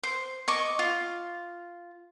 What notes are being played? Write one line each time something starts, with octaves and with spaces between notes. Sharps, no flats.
C5
D#5 C#6 D6
F4